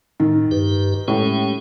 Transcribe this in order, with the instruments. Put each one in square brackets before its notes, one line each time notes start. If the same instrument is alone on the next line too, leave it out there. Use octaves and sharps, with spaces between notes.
[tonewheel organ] A2 [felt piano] D#3
[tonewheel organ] G2 G4 B4
[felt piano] A2 [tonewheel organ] G#3 C#4 G4